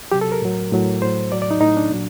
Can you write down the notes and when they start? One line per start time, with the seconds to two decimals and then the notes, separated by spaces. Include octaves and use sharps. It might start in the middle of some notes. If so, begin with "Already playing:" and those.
0.12 C3 F#3 G4
0.21 A4
0.32 A#4
0.41 A2 F#3
0.72 A2 F#3
1.02 A2 F#3 C5
1.32 A2 F#3 D5
1.42 D5
1.51 D#4
1.61 A2 D#4
1.66 F#3
1.77 D4
1.91 A#2 F#3